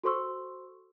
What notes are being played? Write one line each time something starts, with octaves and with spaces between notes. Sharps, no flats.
F#4 A4 C5 C6 C#6 E6